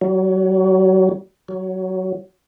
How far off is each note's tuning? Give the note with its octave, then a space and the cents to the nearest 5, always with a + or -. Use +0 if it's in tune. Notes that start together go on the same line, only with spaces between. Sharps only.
F#3 +30
F#3 +15